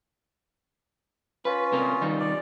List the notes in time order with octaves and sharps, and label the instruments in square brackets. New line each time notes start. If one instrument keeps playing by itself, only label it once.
[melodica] C#4 F4 [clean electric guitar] B4
[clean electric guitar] C3 A#3 A#4
D#3 G3 D#4
[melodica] D5